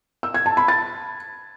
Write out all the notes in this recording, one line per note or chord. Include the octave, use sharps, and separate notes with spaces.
E6
G#6
A5
B5
A6